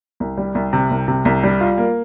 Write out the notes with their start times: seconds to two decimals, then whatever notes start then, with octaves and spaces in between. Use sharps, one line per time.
0.20 C2
0.38 G3
0.55 C2
0.73 C3
0.91 C2
1.08 C3
1.25 C2
1.44 G3
1.61 F4
1.78 A#3